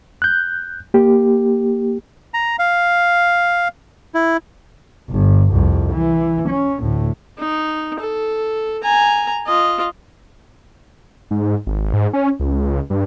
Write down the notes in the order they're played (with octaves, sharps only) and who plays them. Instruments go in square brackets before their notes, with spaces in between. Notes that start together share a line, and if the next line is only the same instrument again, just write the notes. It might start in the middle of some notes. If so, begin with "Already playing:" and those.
[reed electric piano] F#6 G6
A#3 G4
[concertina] A#5
F5
E4
[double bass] G1
C2 F2
E3
C#4
D2 A2
[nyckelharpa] D#4
A4
G#5 A#5
F4 D#5
[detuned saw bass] G#2
G#1
G#2
C#4
C#2
G2